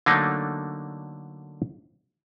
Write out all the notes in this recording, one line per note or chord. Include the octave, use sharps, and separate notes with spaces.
D3 F#3 A3 A#3 D4 D#4